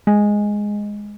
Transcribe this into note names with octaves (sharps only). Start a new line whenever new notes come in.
G#3